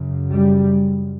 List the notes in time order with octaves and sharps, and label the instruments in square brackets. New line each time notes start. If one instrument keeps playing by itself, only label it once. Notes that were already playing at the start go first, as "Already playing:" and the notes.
Already playing: [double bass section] F#2 C#3
G3